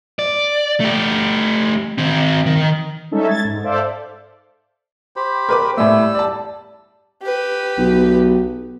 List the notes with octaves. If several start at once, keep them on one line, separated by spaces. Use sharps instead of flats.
D5
A3 G4
D#3 C4
D#3
G3 G#3 C#4 D#4 A4 E5
G#6 A6
G#2
A4 C5 D5 E5 F5 D6
G4 C5 B5
A#4 B4 D6
A2 G3 A3 E6
D5 A5
G4 B4
B1